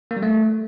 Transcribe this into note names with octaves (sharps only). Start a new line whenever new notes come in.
A#3
G3
A3